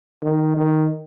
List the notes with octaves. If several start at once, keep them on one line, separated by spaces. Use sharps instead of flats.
D#3
D#3